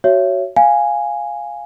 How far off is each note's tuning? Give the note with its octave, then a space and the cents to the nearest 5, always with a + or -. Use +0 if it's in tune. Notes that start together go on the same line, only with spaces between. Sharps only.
F#4 +20 C#5 +0 E5 +25
F5 +0 G#5 -5